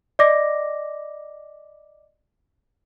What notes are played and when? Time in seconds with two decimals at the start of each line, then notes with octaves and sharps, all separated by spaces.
0.19 D5 D#5 D6 A#6